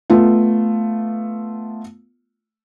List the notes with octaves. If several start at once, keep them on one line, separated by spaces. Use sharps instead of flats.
A3 B3 F4